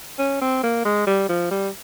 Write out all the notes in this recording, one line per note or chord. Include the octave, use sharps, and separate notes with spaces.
C#4
C4
A#3
G#3
G3
F3
G3